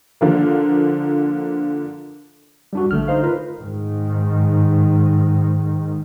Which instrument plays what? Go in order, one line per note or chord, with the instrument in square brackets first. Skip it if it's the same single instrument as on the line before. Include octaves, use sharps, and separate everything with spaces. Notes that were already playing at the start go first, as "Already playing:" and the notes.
[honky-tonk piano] D3 F3 A#3
[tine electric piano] G3 D4 F#4
[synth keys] A#1 A3 [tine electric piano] D3 F6
[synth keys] D#4 C5 F5
F4 A#4 B4
[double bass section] G#2 D#3